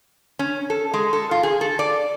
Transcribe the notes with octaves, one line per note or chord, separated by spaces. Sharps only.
C#4
A4
G#3
A4
F4
G#4
A4
D5